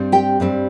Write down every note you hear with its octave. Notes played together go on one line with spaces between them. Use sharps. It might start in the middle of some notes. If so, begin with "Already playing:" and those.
Already playing: G2 G3 C4
G4 G5
G2 G3 C4